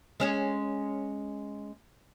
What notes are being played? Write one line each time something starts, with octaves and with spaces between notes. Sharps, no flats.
G#3 C#4 G#4